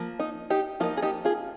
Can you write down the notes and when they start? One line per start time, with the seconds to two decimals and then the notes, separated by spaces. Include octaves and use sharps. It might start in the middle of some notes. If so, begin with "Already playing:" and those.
Already playing: F3 A#3
0.20 D#4
0.50 D#4 G4
0.80 F3 A#3 D#4 F4
0.97 G#4
1.02 D#4 G4
1.25 F4 G#4